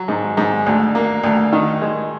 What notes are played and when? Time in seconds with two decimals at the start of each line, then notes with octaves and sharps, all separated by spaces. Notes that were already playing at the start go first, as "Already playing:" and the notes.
Already playing: F#3
0.08 G#2
0.37 G#2
0.66 D2
0.95 A#3
1.23 D2
1.52 D#3
1.82 G#3